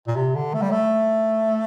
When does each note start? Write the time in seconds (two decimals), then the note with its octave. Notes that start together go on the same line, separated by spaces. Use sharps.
0.07 A#2
0.16 C3
0.35 D3
0.54 A3
0.62 G3
0.71 A3